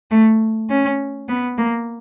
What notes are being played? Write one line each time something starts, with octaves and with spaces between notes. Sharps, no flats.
A3
C#4
B3
A#3